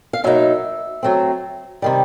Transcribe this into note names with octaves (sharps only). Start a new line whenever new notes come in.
F5
B2 F#3 A#3 D#4 E5
F#3 A3 C4
C3 D#3 G3